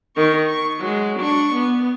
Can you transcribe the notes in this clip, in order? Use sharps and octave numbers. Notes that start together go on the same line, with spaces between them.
D#3 C#6
C#6
F#3 G#3
D4 C#6
B3